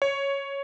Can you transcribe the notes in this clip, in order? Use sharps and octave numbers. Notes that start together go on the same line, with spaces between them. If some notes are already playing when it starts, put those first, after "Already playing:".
C#5